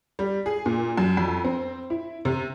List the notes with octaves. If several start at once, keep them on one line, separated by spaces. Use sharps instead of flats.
G3
G#4
A#2
F#2
F2
C4
E4
C3